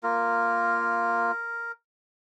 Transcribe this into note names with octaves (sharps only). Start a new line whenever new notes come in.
A#3 F4 A#4